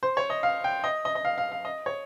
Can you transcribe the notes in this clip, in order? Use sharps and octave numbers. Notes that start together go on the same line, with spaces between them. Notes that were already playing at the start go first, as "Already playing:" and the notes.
C5
C#5
D#5
F5
G5
D#5
D#5
D#5
F5
F5
F5
D#5
C#5